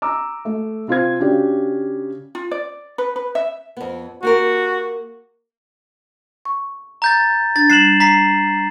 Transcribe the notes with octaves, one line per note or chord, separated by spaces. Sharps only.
A#5 D6 E6
A3
C3 F4 C5 G#6
C#3 D4 F#4 G4
F4
D5
B4
B4
E5
F2 B3
A#3 F#4 G4 A#4
C#6
A#5 G6 A6
D4 A6
G3 F#6 C7 E7 F#7
A#5 B6 C7